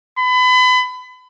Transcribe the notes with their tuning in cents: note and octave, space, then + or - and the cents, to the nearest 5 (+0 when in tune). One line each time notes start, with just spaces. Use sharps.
B5 +30